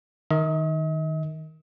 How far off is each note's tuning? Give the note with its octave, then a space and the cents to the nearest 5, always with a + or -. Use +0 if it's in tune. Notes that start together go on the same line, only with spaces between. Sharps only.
D#3 +0 D#5 +45